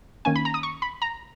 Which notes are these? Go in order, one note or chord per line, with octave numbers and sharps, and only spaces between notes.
D#3 A#3 C#4 G#5
B5
A#5
D#6
C#6
B5
A#5